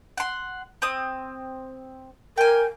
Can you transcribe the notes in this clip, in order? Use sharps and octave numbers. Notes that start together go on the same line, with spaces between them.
F#5 C6
C4 D#6
A#4 G5 G#5